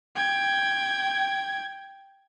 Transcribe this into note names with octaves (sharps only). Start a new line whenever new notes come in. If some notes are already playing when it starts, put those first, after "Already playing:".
G5 G#6